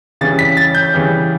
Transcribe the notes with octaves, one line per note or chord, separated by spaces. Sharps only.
C#3 E3 G3 C#4 A6
B6
A6
G6
C#3 E3 G3 C#4